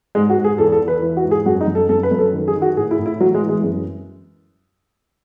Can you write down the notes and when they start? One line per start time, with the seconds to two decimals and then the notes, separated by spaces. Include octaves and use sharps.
0.15 G#2 G#3
0.29 F#4
0.37 G#2
0.44 G#4
0.58 E2 A4
0.72 A4
0.81 E2
0.88 B4
1.02 E3
1.17 F#4
1.24 G#2
1.31 G#4
1.46 F#2 F#4
1.61 D#4
1.67 F#2
1.75 A4
1.89 F#2 A4
2.03 B4
2.11 F#2
2.19 A4
2.33 D#3
2.48 G#4
2.55 D#3
2.62 F#4
2.77 A2 G#4
2.91 E4
2.98 A2
3.06 E4
3.20 E3 F#3
3.34 G#3
3.42 E3
3.49 G#3
3.64 F#2